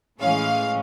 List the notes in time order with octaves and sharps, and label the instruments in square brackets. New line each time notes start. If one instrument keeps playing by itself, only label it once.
[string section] A2 E3 G#3 C#4 F5